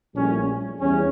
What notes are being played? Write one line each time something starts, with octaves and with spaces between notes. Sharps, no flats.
A#1 A2 G3 C#4
E2 E3 G3 C#4